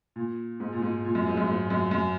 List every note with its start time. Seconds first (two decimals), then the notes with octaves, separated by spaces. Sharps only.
0.16 A#2
0.60 G#2
0.72 A#2
0.82 G#2
1.04 A#2
1.15 F#2
1.26 G#2
1.37 F#2
1.47 G#2
1.70 F#2
1.91 F#2